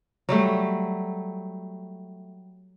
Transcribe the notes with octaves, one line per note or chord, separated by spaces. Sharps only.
F#3 G3 A3